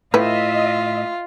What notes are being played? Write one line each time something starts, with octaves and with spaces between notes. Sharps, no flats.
A2 E3 A3 F4 B4 D#5 E5